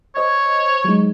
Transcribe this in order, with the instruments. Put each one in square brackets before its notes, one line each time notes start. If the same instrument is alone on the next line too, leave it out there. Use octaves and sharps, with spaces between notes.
[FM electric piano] C5 D#5 G#6 [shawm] C#5
[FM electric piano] F#3 G#3 D#4